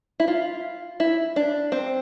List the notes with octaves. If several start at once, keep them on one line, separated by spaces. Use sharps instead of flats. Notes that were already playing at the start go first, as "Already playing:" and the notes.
E4
F4
E4
D4
C4